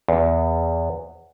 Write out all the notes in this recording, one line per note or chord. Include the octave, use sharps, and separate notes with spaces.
E2